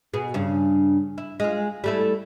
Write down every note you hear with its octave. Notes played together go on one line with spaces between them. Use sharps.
B2 G#4
G2 C#3
E4
G#3 F4
G3 A3 E4